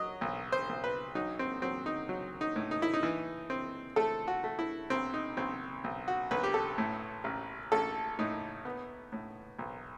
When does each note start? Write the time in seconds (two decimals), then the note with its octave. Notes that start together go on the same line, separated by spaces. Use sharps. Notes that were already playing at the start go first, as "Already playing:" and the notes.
Already playing: F#3 D#5
0.21 B1
0.52 C5
0.69 B1
0.84 B4
1.15 F#3 D#4
1.39 C4
1.62 F#3 C4
1.86 D#4
2.09 F#3
2.41 D#4
2.56 A2
2.71 D#4
2.82 E4
2.93 D#4
3.03 E3
3.50 C4
3.96 A3 A4
4.28 F#4
4.44 A3
4.59 E4
4.90 B1 C4
5.14 D#4
5.37 B1 C4
5.84 B1
6.08 F#4
6.31 B1 B4
6.43 G4
6.54 A4
6.78 A2
7.24 A1
7.72 A1 A4
8.19 A2 D#4
8.65 B3
9.12 A2
9.59 B1